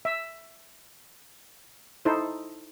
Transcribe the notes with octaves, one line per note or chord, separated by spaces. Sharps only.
E5
D#4 E4 A4 C5